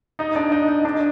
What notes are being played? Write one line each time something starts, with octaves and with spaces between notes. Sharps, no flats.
D#4 D#5
D4 D5
D#4 D#5
D#4 D#5
D4 D5